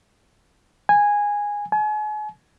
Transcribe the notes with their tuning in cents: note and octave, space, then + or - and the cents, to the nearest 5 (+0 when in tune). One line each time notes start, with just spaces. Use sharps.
G#5 -10
G#5 +40